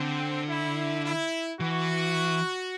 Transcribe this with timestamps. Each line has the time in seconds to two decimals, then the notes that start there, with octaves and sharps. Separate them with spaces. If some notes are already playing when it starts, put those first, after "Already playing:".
Already playing: D3 C4
0.48 E4
1.04 E4
1.60 E3 F#4